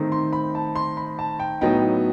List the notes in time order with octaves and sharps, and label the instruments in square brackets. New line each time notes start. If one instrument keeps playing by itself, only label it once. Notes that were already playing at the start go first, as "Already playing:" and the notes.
Already playing: [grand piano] D#3 A3 C4 D#4
C6
B5
A5
C6
B5
A5
G5
A2 F#3 B3 D#4 G5